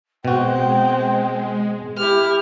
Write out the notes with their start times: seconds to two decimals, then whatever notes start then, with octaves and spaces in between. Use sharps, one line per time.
0.25 B2 G#3 C4 F#4 G5
1.97 E4 G4 F6